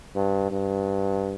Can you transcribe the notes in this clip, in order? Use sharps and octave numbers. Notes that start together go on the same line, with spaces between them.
G2
G2